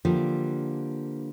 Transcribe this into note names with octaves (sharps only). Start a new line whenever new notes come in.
D3 F3 G3 A#3 D4